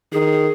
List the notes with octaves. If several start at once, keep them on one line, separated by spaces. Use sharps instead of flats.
D#3 G#4